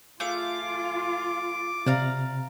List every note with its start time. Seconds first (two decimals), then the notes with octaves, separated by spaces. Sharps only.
0.20 A3 F4 G#4 F5 D6
1.86 C3 D5 F5 A#5